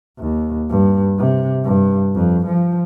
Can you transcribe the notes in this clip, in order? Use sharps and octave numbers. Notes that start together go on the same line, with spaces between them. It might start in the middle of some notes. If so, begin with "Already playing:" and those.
D#2
G2
C3
G2
F2
F3